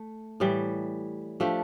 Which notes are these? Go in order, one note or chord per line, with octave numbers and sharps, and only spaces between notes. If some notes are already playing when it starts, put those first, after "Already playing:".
Already playing: A3
A2 E3 G3
F3 A3 D4 G4